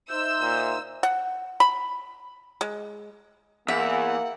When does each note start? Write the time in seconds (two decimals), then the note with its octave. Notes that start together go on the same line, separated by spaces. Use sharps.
0.11 D#4 C5 E5 E6 G6
0.41 A#2
1.03 F#5
1.60 B5
2.61 G#3
3.68 E2 A#3 E5 F#5